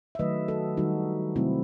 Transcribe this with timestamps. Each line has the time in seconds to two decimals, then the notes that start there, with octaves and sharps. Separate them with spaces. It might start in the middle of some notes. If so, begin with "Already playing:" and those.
0.15 E5
0.19 D#3 F#3 A3 B4 D#5
0.48 F#4 A4
0.77 D#3 G3 D#4 F#4
1.36 C3 F#3 A3 C4 E4